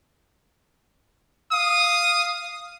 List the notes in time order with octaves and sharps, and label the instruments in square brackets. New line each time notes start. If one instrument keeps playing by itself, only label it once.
[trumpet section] F5 D#6